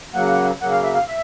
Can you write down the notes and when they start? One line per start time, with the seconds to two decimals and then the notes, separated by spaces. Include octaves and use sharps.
0.14 C#3 F#3 A#3 F#5
0.61 C#3 F#3 A#3 F#5
0.72 F5
0.83 E5
0.95 F5
1.08 E5